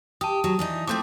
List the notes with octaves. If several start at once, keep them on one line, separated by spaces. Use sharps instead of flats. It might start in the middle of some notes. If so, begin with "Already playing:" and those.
G4 A5 D#6
F#3
E3 D4 D#4
F3 A3 C4 D6 G6